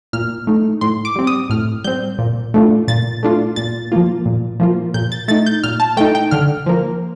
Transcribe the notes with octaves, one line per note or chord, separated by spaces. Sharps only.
A#2 F6
A3 D#4
A2 C6
D6
G3 C4
D#6
A2 F6
G3 C4 G6
A#2
A3 D4 F4
A#2 A6
A3 D4 F4
A#2 A6
F3 A#3 F4
A#2
F3 A#3 F4
A#2 G6
A6
A3 D#4 A6
G6
A#2 F6
A5
A3 D#4 G5
G5
D3 F6
F3 A#3